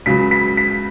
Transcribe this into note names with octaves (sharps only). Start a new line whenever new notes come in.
C#2 C#3 F#3 B6
B6
B6